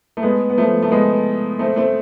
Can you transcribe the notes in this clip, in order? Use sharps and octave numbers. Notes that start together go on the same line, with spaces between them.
A3
G#3 B3
B3
F3 A3
A3
G#3 B3
A3 C4
A3 C4